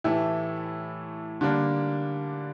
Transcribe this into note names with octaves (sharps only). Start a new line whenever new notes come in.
A2 E3 A3 E4 G4
D3 G3 A#3 D4